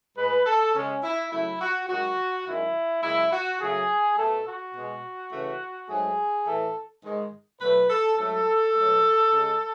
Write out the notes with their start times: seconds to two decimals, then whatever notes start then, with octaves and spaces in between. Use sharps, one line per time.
0.17 A2 G#3 B4
0.46 A4
0.75 C#3 G#3 C#4
1.04 E4
1.32 C#3 F#3 A3 E4
1.61 F#4
1.89 F#2 D#3 G#3 F#4
2.47 F#2 D#3 G#3 E4
3.03 F#2 C#3 G#3 E4
3.33 F#4
3.61 F#2 C#3 F#3 A3 G#4
4.18 B2 A3 A4
4.47 F#4
4.75 B2 G#3
5.32 C#3 E3 A3
5.89 G#2 F#3 A3 G#4
6.47 A2 E3 A3 A4
7.03 G#2 D#3 G#3
7.61 B2 F#3 A3 B4
7.90 A4
8.18 G#2 F#3 A3 A4
8.75 B2 F#3 A3
9.32 C#3 G#3